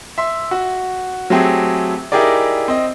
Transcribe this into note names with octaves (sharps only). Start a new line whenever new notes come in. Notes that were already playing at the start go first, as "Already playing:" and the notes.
E5 C6
F#4
F#3 A3 C4 G4 G#4
D#4 E4 G4 G#4 A#4 D5
C4 D#5